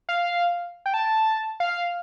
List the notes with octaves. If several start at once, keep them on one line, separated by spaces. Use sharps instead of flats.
F5
G5
A5
F5